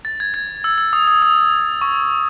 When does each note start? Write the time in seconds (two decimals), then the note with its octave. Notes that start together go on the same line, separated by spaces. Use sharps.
0.05 A6
0.20 G#6
0.34 G#6
0.64 E6
0.78 E6
0.93 D#6
1.08 D#6
1.22 D#6
1.81 C#6